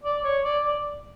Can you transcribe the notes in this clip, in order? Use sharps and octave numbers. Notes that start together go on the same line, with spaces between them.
D5
C#5
D5
D5